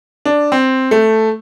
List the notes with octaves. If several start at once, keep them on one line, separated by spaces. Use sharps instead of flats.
D4
C4
A3